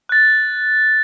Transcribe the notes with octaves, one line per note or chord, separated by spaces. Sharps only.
F#6 A6